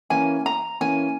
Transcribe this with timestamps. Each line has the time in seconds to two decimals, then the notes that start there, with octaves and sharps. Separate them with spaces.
0.10 E3 A#3 C#4 G#5
0.46 A#5
0.81 E3 A#3 C#4 G#5